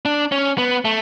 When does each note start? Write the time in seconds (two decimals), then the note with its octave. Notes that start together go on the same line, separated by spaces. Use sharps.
0.05 D4
0.32 C#4
0.58 B3
0.85 A3